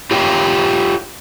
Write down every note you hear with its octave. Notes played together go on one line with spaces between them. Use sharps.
F4 G4 C#5 F5 G5